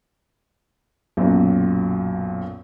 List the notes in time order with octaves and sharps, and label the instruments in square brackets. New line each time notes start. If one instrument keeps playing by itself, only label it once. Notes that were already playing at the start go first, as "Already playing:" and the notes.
[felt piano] B1 F#2 A#2